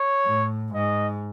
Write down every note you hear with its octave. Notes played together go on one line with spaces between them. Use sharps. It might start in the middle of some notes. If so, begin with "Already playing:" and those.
Already playing: C#5
A2
G#2 D#5